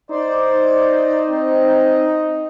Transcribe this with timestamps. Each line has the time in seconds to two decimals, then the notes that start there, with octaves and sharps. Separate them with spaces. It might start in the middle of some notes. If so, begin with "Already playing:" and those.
0.11 D#4 C5 D5
1.27 C4